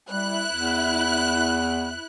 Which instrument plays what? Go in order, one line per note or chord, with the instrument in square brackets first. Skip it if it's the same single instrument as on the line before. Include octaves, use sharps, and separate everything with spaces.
[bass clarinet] G3 [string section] E4 F#6
[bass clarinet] E2